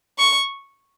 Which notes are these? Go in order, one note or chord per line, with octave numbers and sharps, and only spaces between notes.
C#6